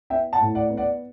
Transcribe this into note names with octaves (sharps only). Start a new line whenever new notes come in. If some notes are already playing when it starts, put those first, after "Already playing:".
B3 E5 G5
F#5 A5
A2
D5 F#5
B3
D5 F#5